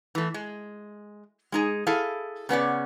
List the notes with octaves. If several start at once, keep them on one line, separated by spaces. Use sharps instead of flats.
E3 A3
G#3
G#3 D#4 G#4
E4 G#4 A4 F5
C#3 B3 C#4 D5